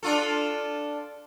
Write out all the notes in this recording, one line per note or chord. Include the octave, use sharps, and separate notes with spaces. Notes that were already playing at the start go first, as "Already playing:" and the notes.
D4 F4 A4